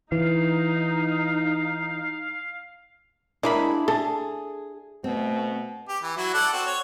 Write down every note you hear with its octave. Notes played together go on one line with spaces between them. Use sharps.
E3 D#4 F5
G#3 A#3 D4 E4 G#4 B5
G#4 A4
B2 A3 C4
G4
E3
F#3 E4 F#4
A4 D5 F#5
C4 F#4
C#5